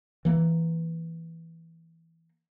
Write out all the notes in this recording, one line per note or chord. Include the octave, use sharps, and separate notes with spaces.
E3 A#3